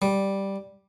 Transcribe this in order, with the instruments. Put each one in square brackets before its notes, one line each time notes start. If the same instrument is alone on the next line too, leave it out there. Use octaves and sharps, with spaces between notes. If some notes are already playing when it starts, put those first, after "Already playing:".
[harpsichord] G3